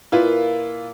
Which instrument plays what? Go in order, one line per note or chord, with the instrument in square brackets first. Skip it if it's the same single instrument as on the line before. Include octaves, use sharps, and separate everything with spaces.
[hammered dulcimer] A#2 [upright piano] E4 F4 B4